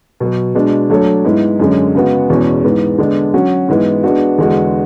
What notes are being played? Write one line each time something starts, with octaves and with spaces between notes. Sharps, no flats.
B2 F#3 B3
B2 G#3 D4
F#3 A3 D4 A4 C#5
G#2 G#3 B3 E4
F#2 D3 G#3 C#4
C#3 G#3 B3 F#4
E2 B2 G#3 C#4
G#2 E3 B3
D3 G#3 B3 D4
F#3 C#4 F#4
G#2 E3 G#3 B3 E4
G#3 B3 D4 F#4
E2 D3 G#3 B3 F#4